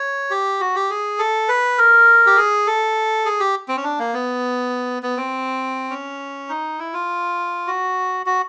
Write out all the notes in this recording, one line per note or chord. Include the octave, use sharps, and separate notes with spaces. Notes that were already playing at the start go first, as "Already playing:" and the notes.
Already playing: C#5
G4
F#4
G4
G#4
A4
B4
A#4
G4
G#4
A4
G#4
G4
C4
C#4
D4
A#3
B3
B3
C4
C#4
D#4
E4
F4
F#4
F#4